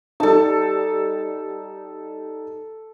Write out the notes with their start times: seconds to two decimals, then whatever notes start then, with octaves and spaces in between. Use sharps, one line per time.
0.20 G3 D#4 A4 A5